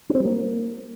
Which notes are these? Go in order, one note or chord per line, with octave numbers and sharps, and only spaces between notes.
C#4
C4
G3
A#3